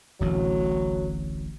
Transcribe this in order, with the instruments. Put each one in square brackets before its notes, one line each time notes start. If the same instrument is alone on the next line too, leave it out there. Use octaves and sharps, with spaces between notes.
[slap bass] D1 A1 A2 [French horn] F#3